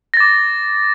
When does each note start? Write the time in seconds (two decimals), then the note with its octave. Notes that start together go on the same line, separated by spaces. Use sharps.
0.14 A#6
0.17 A6
0.20 D6